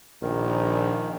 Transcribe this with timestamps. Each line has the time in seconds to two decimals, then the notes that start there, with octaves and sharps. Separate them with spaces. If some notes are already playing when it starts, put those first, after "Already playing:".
0.22 A#1 D#3